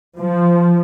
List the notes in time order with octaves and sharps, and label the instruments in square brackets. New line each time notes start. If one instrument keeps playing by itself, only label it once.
[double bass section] F3